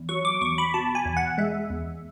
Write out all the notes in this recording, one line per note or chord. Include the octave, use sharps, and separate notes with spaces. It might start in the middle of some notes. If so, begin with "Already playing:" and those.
Already playing: E2
F#3 C#6
D6
E2 C#6
B5
B2 A5
G#5
E2
F#5
G#3 E5
E2